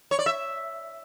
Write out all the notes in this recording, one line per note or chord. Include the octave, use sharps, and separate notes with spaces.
C#5
D5
E5